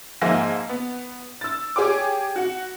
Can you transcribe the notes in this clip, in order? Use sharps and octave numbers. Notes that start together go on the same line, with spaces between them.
G#2 F3 A#3 E5 G#5 A#6
B3
E6 A6
G4 G#4 C#5 G5 D6
F#4 F#5